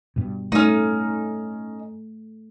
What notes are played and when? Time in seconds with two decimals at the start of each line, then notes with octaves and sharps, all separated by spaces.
0.16 G2 B2
0.52 A3 C#4 D#4